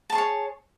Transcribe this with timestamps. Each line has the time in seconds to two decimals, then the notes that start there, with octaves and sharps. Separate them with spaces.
0.10 A5
0.12 C#6
0.15 G#4
0.18 C#5